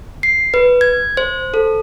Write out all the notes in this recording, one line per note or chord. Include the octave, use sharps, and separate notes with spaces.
C7
B4
G#6
C5
A4